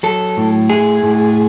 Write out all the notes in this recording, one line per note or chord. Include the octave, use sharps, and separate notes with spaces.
F#3 A4
A2
A3 G#4
A2